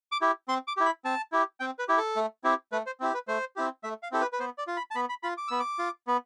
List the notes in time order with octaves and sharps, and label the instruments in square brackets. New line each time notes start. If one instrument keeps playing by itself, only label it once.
[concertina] D6
E4 G4
C4 C6
D6
E4 G4
B5
C4 A5
E4 G4
C4 G5
B4
E4 G4
A4
A3
C4 E4 G4
A3 B4
C5
C4 E4 G4
B4
A3 C5
C4 E4 G4
A3 E5
F5
C4 E4 G4 A4
B4
B4
B3 C5
D5
F4
B5
A5
B3 B5
B5
F4 B5
D6
B3 E6
D6
F4
B3